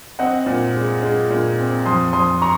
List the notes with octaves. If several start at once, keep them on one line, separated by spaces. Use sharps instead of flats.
C4 D#5 F#5
A#2
G#3
G#3
A#2
C4
F2 C6 D#6
F2 C6 D#6
A#5 C#6